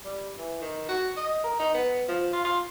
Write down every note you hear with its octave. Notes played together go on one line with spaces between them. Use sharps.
G3
E3
D#3
F#4
D#5
A#4
D#4
B3
F3
F4
F4